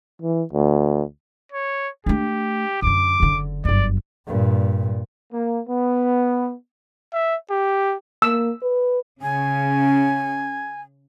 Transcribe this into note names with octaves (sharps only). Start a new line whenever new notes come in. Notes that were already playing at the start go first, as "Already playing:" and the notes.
E3
D2
C#5
A3 D4 G4
F#2 D3 D6
F#1 D3
G1 F#2 D5
G2 A#2
A#3
B3
E5
G4
A#3 E6
B4
C#3 G#5